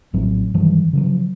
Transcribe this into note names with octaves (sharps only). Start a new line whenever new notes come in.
A#1 A2 F#3 C4
G2 D#3 E3 F#3
C#3 F3 F#3